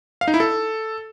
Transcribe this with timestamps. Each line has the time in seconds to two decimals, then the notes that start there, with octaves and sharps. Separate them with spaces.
0.21 F5
0.28 D#4
0.34 E4
0.40 A4